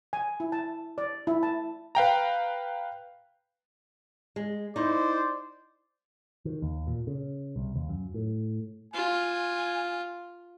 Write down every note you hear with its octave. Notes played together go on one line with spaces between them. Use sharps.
G#5
E4
A5
D5
E4
A5
B4 F5 G5 A#5
G#3
D#4 E4 C5 D5
D#3
D#2
A#2
C#3
C2
D#2
F#2
A2
F4 G#5